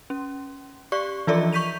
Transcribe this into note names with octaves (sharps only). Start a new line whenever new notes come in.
C#4
G4 D5 C#6
E3 F3 F4 A4 D5 E5
C#6 G6 B6 D#7 F7